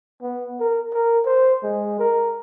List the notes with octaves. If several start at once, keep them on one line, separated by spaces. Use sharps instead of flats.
B3
A#4
A#4
C5
G#3
A#4